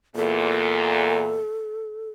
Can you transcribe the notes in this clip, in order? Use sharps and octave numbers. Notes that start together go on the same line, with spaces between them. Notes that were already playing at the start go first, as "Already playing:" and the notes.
E2 A#2 A4